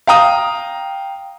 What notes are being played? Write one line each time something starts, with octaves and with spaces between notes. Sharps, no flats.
F5 G5 A#5 D#6